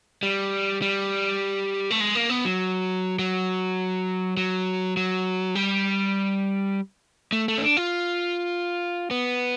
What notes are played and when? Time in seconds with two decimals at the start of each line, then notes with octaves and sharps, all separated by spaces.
0.23 G3
0.82 G3
1.90 A3
2.00 G#3
2.15 A#3
2.30 B3
2.45 F#3
3.19 F#3
4.37 F#3
4.97 F#3
5.55 G3
7.32 A3
7.48 A3
7.58 C#4
7.62 D4
7.77 F4
9.11 B3